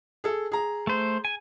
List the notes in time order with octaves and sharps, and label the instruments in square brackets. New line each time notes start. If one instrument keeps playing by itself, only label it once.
[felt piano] G#4 A4
G#4 A#5
[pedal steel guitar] A3 C5
G#5